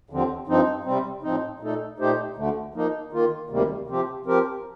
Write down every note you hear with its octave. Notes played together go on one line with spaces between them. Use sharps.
D#2 D3 F3 C4
G2 F3 C4 D#4
C3 G3 C4
A2 F3 C4 D#4
A#2 A3 D#4 A4
A#2 A3 D#4 G4 C5
D2 D3 A3
F3 A#3 D#4
D#3 A#3 F4
D2 C3 D#3 G3 A#3
C3 F3 C4 G4
F3 C4 G4 A#4